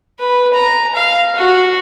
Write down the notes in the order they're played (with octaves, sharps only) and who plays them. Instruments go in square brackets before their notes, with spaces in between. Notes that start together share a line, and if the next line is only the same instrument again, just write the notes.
[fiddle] B4
A#5
F5
F#4